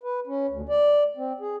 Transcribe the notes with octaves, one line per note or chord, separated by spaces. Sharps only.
B4
C#4
D2
D5
C4
G#4